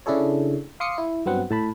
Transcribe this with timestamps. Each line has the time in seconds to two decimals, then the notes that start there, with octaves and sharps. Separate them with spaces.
0.06 C#3 D4 E4 G#4 A4 C#5
0.80 F5 C6 D6 D#6 C7 C#7
0.98 E4
1.26 G2 F#3 B3 C4 F#5
1.51 A2 A5 B5